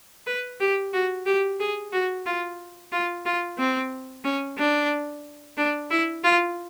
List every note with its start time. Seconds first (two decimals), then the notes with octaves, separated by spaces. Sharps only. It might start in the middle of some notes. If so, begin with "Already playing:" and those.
0.27 B4
0.60 G4
0.93 F#4
1.26 G4
1.60 G#4
1.92 F#4
2.26 F4
2.92 F4
3.26 F4
3.58 C4
4.24 C#4
4.58 D4
5.57 D4
5.90 E4
6.24 F4